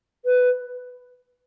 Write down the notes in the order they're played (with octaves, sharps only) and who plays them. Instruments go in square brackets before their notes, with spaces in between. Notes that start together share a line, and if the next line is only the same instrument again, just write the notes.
[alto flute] B4